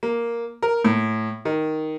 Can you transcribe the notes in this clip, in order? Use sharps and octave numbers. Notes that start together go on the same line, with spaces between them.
A#3
A#4
A2
D#3